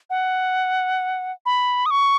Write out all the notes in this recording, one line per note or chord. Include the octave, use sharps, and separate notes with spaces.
F#5
B5
D#6
C#6